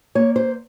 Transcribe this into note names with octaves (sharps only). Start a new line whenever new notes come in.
A#3 C#5
C5